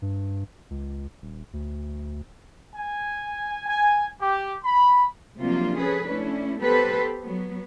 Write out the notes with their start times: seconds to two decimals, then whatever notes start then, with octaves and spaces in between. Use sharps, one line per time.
0.02 G2
0.70 C#2
1.22 D#1
1.53 D2
2.76 G#5
3.68 G#5
4.21 G4
4.65 B5
5.40 C3 F3 F#3 A#3 D4 F4
5.77 C#4 G#4 A4 B4
6.07 A3 C#4 D4 E4
6.59 B3 G4 A4 B4 C5
7.22 F#3 B3